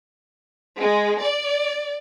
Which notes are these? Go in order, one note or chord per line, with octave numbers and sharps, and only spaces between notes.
G#3
D5